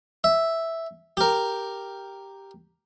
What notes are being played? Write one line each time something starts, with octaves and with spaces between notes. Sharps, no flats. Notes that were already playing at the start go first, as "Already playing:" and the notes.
E5
G4 A#4